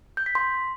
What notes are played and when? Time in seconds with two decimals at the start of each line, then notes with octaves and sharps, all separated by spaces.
0.17 G6
0.26 B6
0.35 C6